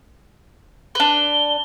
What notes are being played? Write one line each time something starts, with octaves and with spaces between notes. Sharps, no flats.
D4 B4 G7